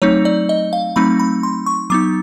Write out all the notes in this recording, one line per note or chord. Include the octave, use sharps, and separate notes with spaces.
F#3 A3 C4 D#4 C#5
D5
D#5
F5
F#3 A3 C4 D#4 B5
B5
C6
C#6
F#3 B3 D#4 D6